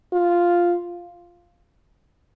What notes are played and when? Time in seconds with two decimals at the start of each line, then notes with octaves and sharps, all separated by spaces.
0.13 F4